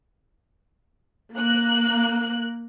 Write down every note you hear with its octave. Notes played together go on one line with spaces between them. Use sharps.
A#3 F#6